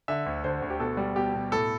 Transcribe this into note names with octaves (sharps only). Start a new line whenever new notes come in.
D3 E5
D2
D3 C5
D2
G4
B2 A4
G3
B2 G4
B2
A2 A4